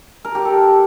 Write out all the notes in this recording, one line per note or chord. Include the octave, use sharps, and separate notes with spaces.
A#4
G4
A4